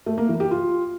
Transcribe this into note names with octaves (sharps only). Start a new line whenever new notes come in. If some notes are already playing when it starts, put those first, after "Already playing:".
A3
A#3
E3
G4
F4